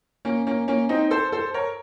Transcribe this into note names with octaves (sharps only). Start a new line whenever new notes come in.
A#3 C#4
A#3 C#4
A#3 C#4
C4 D#4
A4 C5
A4 C5
A#4 C#5